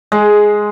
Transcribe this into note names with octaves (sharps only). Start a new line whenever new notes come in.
G#3